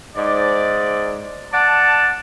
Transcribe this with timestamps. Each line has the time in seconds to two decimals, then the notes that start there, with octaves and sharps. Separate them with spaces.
0.16 G#2 D5
1.53 D5 F#5 A5